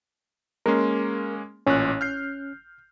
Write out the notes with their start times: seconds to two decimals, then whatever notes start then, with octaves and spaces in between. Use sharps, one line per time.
0.66 G#3 A#3 C#4 A#4 C6
1.67 A1 A#2 C#4 F#6
2.01 F6 G6 C7